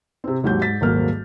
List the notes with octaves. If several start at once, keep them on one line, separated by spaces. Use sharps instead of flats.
C3 C4
D#2 G#2 F#3 G4 G6
G#2 A6 B6
D#1 G#1 F#3 G#3 A#3 F6